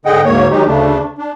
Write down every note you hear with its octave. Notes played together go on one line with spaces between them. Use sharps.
G#2 D3 G#4 D#5 F#5 G5
D2 G#2 A#3 C#5
D#3 F#3 G#3 D#4 G4
D2 C#3 A3 D4
D4